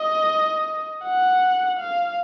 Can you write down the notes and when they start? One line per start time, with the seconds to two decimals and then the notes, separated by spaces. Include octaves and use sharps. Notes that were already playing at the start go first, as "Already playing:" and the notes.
Already playing: D#5
1.05 F#5
1.79 F5